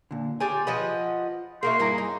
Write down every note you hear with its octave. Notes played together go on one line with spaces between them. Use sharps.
A#2 D3
F4 G4 G#4 G#5
F3 B4 D#5 F#5
A#3 D#4 F#4 G#4 A#4 E5 C6
G2 A#3 E4 G#4 A#5
D#4